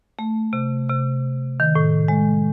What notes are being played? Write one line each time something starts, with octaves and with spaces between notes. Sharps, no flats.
A3
C3
C3
D#3
A2
G#3